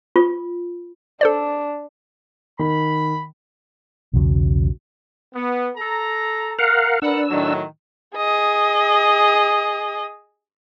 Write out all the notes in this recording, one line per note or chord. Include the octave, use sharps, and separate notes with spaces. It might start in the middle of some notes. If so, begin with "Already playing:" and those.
F4
D4 A4 C5 D5
D#3 B5
B1 E2 C#3 F#3
B3
A4 A#5
A#4 F5 F#5
D4 A#4 B4 F#5 E6
A2 D#3 F#3
G#4 D#5